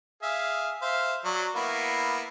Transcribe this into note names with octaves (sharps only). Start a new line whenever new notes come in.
G#4 E5 F5
C5 E5 F5
F#3 D5
A#3 B3 E4